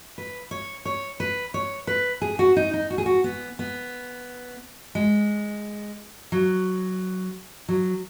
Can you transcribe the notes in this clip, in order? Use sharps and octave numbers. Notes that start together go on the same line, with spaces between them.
B4
C#5
C#5
B4
C#5
B4
G#4
F#4
D#4
D#4
F#4
G#4
F#4
B3
B3
G#3
F#3
F#3